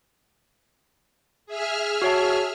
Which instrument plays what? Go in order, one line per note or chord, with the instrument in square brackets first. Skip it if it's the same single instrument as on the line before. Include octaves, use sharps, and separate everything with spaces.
[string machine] G#4 E5 F6
[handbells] F#4 C#5 A5